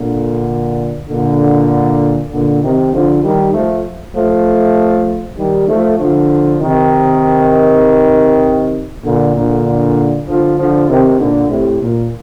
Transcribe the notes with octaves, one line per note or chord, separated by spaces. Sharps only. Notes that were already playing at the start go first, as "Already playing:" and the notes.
Already playing: A#2 D3
A#2 D3
A#2 D3
C3 D#3
D3 F3
D#3 G3
F3 A3
F3 A3
D#3 G3
F3 A3
D3 F3
C3 D#3
A#2 D3
A#2 D3
D3 F3
D3 F3
C3 D#3
A#2 D3
A2 C3
A#2